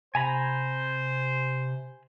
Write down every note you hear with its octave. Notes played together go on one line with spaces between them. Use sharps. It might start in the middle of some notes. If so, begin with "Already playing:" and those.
C3 C5 G#5 A#5 B5